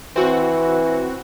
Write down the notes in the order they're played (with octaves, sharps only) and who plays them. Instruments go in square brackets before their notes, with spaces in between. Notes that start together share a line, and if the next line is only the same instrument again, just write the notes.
[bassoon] E3 [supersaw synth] C4 F#4